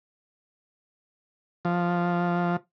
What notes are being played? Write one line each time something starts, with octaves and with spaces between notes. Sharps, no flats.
F3